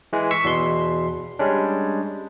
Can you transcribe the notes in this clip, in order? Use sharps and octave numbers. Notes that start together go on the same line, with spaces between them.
E3 G#3
C#6 E6 B6 C7
E2 B2 C6
G3 G#3 C#4 D4